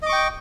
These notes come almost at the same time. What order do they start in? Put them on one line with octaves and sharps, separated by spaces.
D#5 D6 C#6 G5